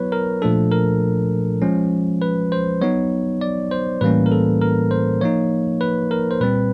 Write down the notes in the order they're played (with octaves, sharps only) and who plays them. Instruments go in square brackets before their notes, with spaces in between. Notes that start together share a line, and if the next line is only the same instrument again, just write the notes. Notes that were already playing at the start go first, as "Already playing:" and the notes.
Already playing: [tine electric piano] F#3 B3 E4 B4 C#5
A#4
A#2 F3 A3 D4 A4
A#4
F3 G#3 C#4
B4
C5
F#3 B3 D#4 C#5
D5
C5
A2 E3 G3 A#3 C#4 B4
A#4
A4
A#4
C5
F3 A#3 D#4 C#5
B4
A#4
C5
A#2 G3 C4 B4